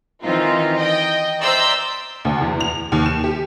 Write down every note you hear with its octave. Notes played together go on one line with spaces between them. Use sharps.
D#3 E3 C4 D#4 F4
D#5 G5
C5 D5 E5 A#5 E6 G6
D2
E2
F7
D#2
E7
G4